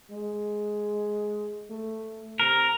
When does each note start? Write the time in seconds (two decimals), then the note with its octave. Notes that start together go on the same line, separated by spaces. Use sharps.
0.11 G#3
1.70 A3
2.40 C3 A#4